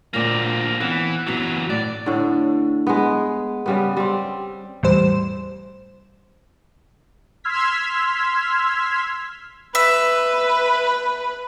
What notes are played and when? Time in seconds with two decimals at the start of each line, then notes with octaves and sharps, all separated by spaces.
0.13 D2 A#2 A#3 C4 D5
0.80 E3 B3 C4
1.27 F#2 B2 E3 F#3
1.70 A2 D5
2.06 A2 D3
2.87 G#3 B3
3.66 C#3 G3 B3
3.97 G3 C4
4.83 E2 A2 G3 C5 E7
7.44 C6 E6 F6 G#6 B6
9.75 B4 E5